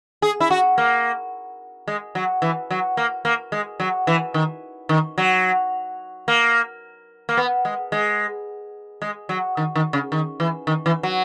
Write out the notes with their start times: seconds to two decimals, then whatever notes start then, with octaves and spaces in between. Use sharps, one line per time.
0.22 G#4
0.40 E4
0.51 F#4
0.78 A#3
1.88 G#3
2.15 F#3
2.42 E3
2.71 F#3
2.97 A#3
3.25 A#3
3.52 G#3
3.80 F#3
4.07 E3
4.34 D#3
4.89 D#3
5.18 F#3
6.28 A#3
7.29 A#3
7.37 B3
7.65 G#3
7.92 G#3
9.02 G#3
9.29 F#3
9.57 D#3
9.76 D#3
9.93 C#3
10.12 D#3
10.40 E3
10.67 D#3
10.86 E3
11.03 F#3